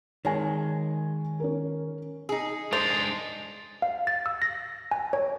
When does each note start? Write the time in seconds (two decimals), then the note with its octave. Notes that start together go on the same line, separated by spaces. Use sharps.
0.25 D#3 G#3 C#5 G#5
1.40 C#4 A#4
2.29 D#4 G#4
2.73 G#3 D4 C5 A6 F7
3.82 F5
4.07 A6
4.26 E6
4.42 A#6
4.91 G#5
5.13 C#5